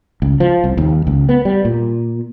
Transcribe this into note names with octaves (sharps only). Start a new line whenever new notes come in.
C#2
F3
C2
D#2
C#2
B3
G3
A#2